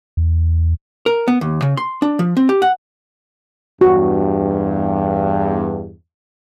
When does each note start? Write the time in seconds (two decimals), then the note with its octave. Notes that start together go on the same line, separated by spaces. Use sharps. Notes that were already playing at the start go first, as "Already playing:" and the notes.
0.17 E2
1.06 A#4
1.28 B3
1.41 D#2
1.62 C#3
1.77 C6
2.02 D4
2.19 F3
2.37 C4
2.49 G4
2.62 F#5
3.81 E2 G2 F#4